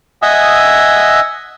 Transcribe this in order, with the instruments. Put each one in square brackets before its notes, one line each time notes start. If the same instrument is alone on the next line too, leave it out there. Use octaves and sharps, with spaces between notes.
[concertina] D#5 E5 F#5 G#5 D#6 E6